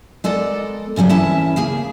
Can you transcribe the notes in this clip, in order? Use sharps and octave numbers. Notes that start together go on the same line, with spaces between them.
G#3 B3 A4 A#4 D5 D#5
A2 C#3 F#3 G3
E2 C#4 E4 A5
C#3 A#3 G#4